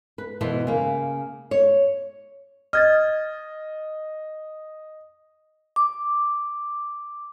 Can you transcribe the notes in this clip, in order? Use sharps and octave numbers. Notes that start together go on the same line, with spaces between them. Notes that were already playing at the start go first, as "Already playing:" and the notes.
B4
B2 E3 B3 E4 C5
C#3 A#3
C#5
D#5 F6 G#6 A6
D6